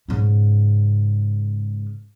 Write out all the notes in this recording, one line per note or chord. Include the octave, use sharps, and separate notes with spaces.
G#2 C#3